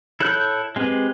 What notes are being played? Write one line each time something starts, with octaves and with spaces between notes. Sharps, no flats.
E4 A4 C#5 F#6 G6
G#3 C4 G4 B4